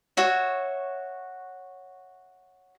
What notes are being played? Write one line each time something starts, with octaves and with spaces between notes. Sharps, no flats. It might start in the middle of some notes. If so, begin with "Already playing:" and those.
F#4 C#5 E5